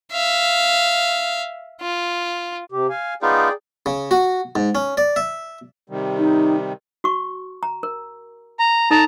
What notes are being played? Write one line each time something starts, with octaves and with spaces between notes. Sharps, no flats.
E5 F5
F4
C3 G4
F5 G#5
B3 D#4 F4 G#4 D5 G5
C#3
F#4
G#2
C#4
D5
E5
C3 D#3 G3
D#4
F#4 C#6
A#5
A#4
A#5
D#4 A4 D5 A5 A#5